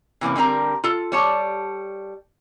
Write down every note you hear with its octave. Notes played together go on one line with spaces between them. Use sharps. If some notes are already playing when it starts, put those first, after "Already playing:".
C3 E3 A#3 C#4
D3 G3 C4 A#4 A#5
F4 A4
G3 C#5 A5